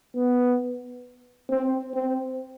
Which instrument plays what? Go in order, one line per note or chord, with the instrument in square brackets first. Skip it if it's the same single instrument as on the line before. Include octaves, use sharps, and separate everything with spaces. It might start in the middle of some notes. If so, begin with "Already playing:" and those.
[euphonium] B3
C4
C4